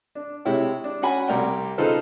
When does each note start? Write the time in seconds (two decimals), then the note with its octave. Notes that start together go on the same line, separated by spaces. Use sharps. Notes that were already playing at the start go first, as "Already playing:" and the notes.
0.15 D4
0.45 C3 G#3 E4 C#5 G5
0.84 D4
1.02 C#4 F#4 F#5 G#5 B5
1.28 C2 A#4 D5 G5
1.78 C#3 D#4 F4 A4 B4 C5